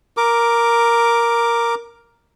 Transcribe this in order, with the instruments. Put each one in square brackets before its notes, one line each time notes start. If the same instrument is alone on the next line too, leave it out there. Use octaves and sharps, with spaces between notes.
[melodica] A#4 D6